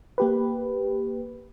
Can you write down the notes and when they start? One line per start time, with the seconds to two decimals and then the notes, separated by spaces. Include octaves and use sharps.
0.18 A#3 G4 B4